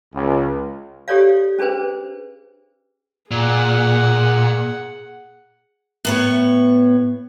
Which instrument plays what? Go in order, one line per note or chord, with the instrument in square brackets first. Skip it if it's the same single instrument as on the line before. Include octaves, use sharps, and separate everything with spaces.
[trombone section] C#2
[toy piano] G4 A4 C#5 D5 F5
C#4 D4 G#4 B4 C5
[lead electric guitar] A#2 [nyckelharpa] G#4 F#5
[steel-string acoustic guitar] A2 B3 C#5